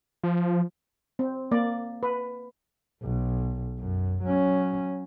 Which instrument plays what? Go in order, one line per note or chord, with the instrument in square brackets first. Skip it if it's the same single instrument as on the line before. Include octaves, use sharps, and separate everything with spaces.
[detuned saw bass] F3
[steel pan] C4
A#3 D5
B4
[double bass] B1
F#2
F#3 C#4